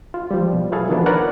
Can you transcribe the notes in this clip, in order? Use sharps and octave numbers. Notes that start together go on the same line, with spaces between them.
F4
F3 G3
B2
F#3 E4 F#4 G#4 A4 F5
D#3 F3 A#3 B3 D4
A#4 B4 C#5 D5 F#5